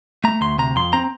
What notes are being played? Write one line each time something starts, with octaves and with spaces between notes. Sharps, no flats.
A3 A#5
D2 C6
C3 A#5
F2 C6
C4 A#5